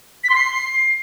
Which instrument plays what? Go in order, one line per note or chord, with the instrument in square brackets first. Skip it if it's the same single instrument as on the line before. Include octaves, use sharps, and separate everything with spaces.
[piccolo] B6
C6
C7